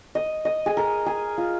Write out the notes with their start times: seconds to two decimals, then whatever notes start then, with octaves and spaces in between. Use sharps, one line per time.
0.15 D#5
0.45 D#5
0.66 G#4
0.77 A#4
1.06 G#4
1.38 F4